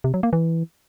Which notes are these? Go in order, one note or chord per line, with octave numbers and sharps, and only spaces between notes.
C3
F#3
A#3
E3